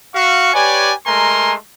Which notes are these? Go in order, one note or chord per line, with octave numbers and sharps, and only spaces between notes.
F#4 F5 C#6
G4 B4 C#5 D5 G#5
G#3 A3 A#4 G#5 A#5 C6